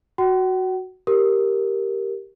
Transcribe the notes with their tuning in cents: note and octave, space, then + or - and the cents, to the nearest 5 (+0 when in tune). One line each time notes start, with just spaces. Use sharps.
F#4 +0 F#5 +45
G4 +0 A#4 +0